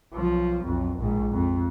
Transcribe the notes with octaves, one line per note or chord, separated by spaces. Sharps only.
B1 F3
B1 F2
A#1 G#2
F2